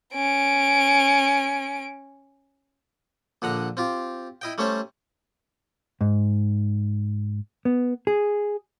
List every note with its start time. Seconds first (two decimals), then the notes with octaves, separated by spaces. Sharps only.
0.14 C#4 D7
3.42 A#1 D3 F#5 A#5
3.77 C4 F4 G4
4.42 E4 D#5 G5
4.58 G3 A3 C#4 C5 C#5
6.01 G#2
7.65 B3
8.07 G#4